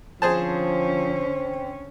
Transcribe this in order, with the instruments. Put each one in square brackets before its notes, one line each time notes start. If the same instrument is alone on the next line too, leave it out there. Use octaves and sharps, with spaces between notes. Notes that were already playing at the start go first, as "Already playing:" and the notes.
[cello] D3 C#4 [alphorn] F3 [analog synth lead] C4 [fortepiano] G#4 C5 A5